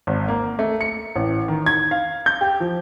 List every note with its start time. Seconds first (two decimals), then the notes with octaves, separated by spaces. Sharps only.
0.07 G#1
0.28 A#3
0.59 A3
0.81 C#7
1.16 A1
1.48 D#3
1.66 G#6
1.91 F5
2.26 G6
2.41 G4
2.60 F3